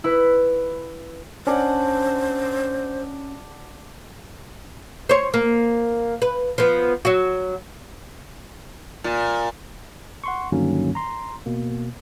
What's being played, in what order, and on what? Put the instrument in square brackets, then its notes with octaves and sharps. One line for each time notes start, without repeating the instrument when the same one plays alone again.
[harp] E4 B4
[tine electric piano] C#4 [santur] D4 D5 F#5 [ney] C5
[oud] C5 C#5
A#3
B4
F3 B3
F#3 F#4
[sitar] A#2
[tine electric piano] F#5 C6 C#6
G2 D3 D#3 F#3 A#3 C#4
A#5 C6
B2 A#3